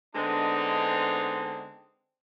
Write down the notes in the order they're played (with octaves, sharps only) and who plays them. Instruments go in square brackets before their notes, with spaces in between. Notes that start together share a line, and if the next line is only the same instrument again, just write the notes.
[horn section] D3 G#3 B3 C4 D4 D#4